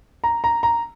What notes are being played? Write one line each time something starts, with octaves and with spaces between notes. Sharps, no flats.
A#5
A#5
A#5